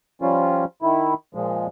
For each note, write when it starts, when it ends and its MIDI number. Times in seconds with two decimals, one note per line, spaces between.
0.22 0.65 53
0.22 0.65 55
0.22 0.65 61
0.22 0.65 65
0.82 1.14 51
0.82 1.14 64
1.35 1.67 46
1.35 1.67 53
1.35 1.67 56